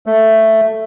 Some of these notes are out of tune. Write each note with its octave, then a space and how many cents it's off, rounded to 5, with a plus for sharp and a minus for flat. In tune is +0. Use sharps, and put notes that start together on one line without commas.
A3 +5